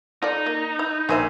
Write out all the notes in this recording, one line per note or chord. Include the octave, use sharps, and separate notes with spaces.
D#4 F4 A4 D5
A#3
E4
A#1 D#3 C5 E5 G#5 D#7